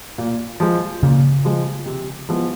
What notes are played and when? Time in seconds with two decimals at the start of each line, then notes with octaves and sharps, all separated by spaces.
0.18 A#2
0.60 F3 G#3
1.03 A#2 C#3
1.45 F3 G#3
1.86 C3
2.29 F3 G#3 B3 E4